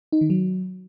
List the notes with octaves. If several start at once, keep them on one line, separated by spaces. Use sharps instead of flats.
D#4
D#3
F#3